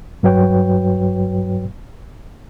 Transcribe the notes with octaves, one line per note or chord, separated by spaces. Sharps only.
G2 F#3 F#4 B4 C#5 G5